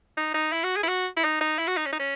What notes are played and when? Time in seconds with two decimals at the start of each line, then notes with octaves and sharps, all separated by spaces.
0.17 D#4
0.34 D#4
0.53 E4
0.64 F#4
0.76 G#4
0.83 E4
0.88 F#4
1.17 E4
1.24 D#4
1.41 D#4
1.58 E4
1.67 F#4
1.77 D#4
1.86 C#4
1.93 D#4
1.99 C#4